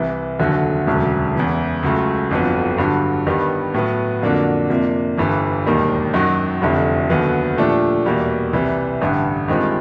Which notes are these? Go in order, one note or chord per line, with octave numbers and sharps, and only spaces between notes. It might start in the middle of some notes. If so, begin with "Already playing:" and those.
Already playing: C2 C3 E3
F1 D#2 D3 F#3
E1 D2 C#3 F#3
E2 C#3 E3
C#2 C#3 F#3 A3
G1 F2 D3 F#3 B3
G2 D3 F#3
G2 D#3 G3 B3
A2 F#3 B3
F2 D3 F#3 A#3 D4
F2 C3 F3 A#3 D4
G1 G2 E3
E1 D#2 D#3 G3 A#3
F#2 D#3 F#3
F1 F2 D3 G3
D#2 D3 F#3 B3
A#2 F3 A3 D4 G4
E2 B2 G3 A#3
C2 C3 E3 G3
A1 G2 D3
G2 D#3 G#3 C4 F4